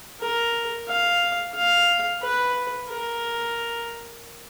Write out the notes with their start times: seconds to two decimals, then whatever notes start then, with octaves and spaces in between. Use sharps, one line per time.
0.21 A#4
0.88 F5
1.55 F5
2.22 B4
2.88 A#4